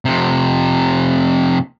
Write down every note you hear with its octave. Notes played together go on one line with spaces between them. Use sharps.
F2 C3